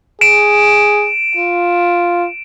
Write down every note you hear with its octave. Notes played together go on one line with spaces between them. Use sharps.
G#4 D7 E7
F4